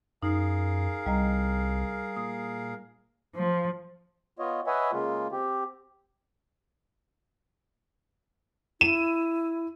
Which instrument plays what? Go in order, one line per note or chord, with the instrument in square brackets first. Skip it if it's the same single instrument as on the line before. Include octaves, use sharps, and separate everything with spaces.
[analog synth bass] F#2 [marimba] D#4 [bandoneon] G#4 A#4 F5
[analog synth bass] C2 [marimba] G3 D#5 A#5
[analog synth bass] A#2 [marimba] D#6
[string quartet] F3
[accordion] B3 F4 C#5 D#5
B4 C#5 D#5 E5 F#5 G#5
C#3 G#3 A#3 F4
C4 G4
[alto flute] E4 [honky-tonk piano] D#7 E7